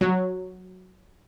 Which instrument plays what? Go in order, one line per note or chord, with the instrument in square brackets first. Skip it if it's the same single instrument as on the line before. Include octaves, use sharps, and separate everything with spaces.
[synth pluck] F#3